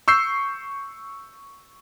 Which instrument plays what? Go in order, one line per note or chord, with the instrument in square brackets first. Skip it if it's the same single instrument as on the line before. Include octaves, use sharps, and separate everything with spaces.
[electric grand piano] C#6 E6 G6 C7